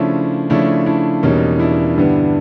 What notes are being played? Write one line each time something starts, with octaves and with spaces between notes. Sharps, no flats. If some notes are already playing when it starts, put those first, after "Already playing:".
Already playing: C#3 F3 A3 C#4 D4 E4
C#3 F3 A3 C#4 D4 E4
D4 E4
E2 B2 G3 A#3 C#4 D#4
D4 E4
G2 D3 G3 B3